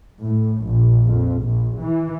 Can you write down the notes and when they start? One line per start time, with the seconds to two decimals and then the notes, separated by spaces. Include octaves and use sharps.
0.21 A2
0.65 A#1
1.06 F2
1.42 A#1
1.80 E3